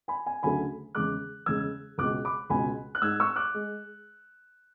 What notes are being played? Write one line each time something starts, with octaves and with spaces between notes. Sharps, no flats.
G#5 B5
G#5
D2 C#3 F#3 A3 G#5 B5
E2 C#3 G#3 D6 F#6
E2 C#3 G#3 E6 G#6
C#2 B2 G#3 D6 F#6
B5 D6
C#2 B2 G#3 G#5 B5
F#6
G#2 G#3 E6 G#6
C#6 E6
D6 F#6
G#3